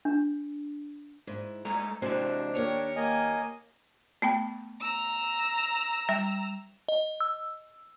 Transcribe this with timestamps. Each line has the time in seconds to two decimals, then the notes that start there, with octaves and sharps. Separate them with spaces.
0.05 D4
1.27 G#2 E4
1.65 G#3 A3 D#4 A4 A#5
2.02 C3 E3 G#3 C4 D4 F#4 C5
2.55 D#2 G4 A#4 C#5
2.96 A#3 D#5 G#5
4.22 A3 B3 G5
4.81 A#5 E6
6.09 G3 E5
6.88 D#5
7.20 E6